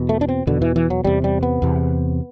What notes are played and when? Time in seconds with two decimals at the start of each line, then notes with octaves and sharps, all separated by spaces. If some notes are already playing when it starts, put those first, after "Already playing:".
Already playing: E2 B2
0.09 A3
0.21 D4
0.29 C4
0.47 E2 B2 D3
0.62 E3
0.76 E3
0.90 F#3
1.04 E2 C3 G3
1.24 G3
1.43 B3
1.62 E2 C3